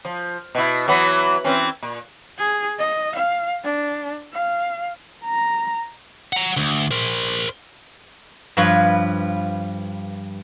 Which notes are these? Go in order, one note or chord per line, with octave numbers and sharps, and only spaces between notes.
F3
B2 E4
E3 F#3 B3
E3 C4 C#4
A#2
G#4
D#5
F5
D4
F5
A#5
F#5 A#5
D2
A#4 C5
G2 F3 F4 B4 C#5